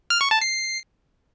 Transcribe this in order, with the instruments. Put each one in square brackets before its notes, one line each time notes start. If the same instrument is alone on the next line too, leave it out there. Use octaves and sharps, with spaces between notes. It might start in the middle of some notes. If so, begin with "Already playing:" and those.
[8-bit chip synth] F6
C#6
A5
C7